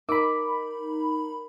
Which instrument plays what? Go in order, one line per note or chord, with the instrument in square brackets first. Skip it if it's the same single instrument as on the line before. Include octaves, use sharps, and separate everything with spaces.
[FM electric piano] D#4 B5 [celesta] A#4 [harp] D6